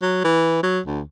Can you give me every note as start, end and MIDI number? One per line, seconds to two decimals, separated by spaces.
0.02 0.20 54
0.24 0.60 52
0.63 0.79 54
0.86 1.01 38